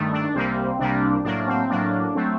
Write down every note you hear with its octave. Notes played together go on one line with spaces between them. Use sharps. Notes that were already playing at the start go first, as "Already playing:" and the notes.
Already playing: G2 D#3 A3
D4
C2 C3 G3 A#3 C4
C2 C3 G3 A#3 D4
A2 F#3 A#3 D4
C4
A2 F#3 A#3 D4
F#3 A3 C4